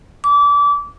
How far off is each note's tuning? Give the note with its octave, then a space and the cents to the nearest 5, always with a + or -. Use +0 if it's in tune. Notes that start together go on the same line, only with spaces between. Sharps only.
D6 -30